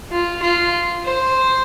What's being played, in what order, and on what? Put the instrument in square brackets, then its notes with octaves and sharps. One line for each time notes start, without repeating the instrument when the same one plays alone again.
[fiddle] F4
F4
C5